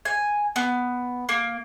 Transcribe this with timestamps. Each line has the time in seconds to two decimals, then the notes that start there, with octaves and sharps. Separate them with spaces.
0.05 G#5
0.56 B3
1.29 A#3